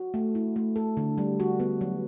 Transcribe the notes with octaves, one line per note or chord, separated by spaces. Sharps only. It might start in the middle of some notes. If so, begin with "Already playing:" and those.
Already playing: F#4
A3
E4
A3
A4
D3
G3
F#4
B3
F#3